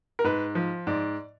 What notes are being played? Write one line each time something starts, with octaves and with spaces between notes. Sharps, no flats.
A#4
G#2 B4
F3
G#2 D5